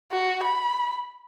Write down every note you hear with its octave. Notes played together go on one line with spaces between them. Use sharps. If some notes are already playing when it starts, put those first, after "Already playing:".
F#4
B5